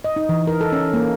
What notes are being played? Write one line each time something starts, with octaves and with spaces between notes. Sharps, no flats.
D#5
D#4
E3
A#4
A4
C#4
A#3